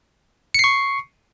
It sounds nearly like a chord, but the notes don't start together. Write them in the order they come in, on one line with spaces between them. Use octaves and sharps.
C#7 C7 C#6